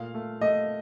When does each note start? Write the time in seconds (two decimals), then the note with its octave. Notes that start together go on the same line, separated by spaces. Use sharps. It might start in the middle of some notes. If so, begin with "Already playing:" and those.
Already playing: A#2 A3 F5
0.14 A3
0.41 A3 D#5